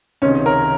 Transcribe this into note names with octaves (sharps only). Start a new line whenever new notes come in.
C#2 C3 D#3 C#4
A#4